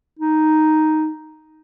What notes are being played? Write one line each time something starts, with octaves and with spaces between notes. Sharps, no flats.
D#4